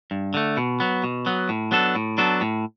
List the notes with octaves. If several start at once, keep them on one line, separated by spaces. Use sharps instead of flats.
G2
D3 A3
B2
F#3 B3
B2
F#3 B3
A2
F#3 B3 D4 A4
A2
F#3 B3 D4 A4
A2